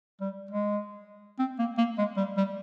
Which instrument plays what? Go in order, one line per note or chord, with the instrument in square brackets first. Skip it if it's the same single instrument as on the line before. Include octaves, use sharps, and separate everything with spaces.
[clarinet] G3
G#3
C4
A#3
A#3
G#3
G3
G3